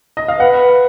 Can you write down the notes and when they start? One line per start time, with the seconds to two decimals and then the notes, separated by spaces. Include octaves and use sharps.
0.17 D#5
0.28 F5
0.40 B4 F#5